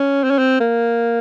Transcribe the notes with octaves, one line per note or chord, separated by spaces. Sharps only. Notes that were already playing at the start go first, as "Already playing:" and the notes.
Already playing: C#4
C4
C#4
C4
A#3